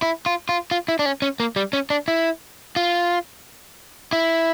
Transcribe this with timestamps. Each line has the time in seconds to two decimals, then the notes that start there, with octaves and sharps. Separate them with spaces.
0.02 E4
0.26 F4
0.49 F4
0.71 F4
0.88 E4
0.99 D4
1.06 C#4
1.22 C#4
1.40 A#3
1.56 G3
1.73 C#4
1.90 D4
2.08 E4
2.76 F4
4.13 E4